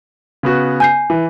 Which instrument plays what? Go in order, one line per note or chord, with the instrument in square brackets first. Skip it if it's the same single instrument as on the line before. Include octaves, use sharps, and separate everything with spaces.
[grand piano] C#3 B3 F#4
[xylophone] G#5 G6 C7
[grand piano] E3